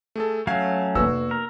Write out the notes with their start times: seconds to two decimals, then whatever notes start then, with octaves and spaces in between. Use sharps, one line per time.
0.16 A3 G#4 A4
0.47 F#3 A3 C#4 F5 G#6 C7
0.95 F1 A#3 B3 F#4 B4 E6
1.31 A#4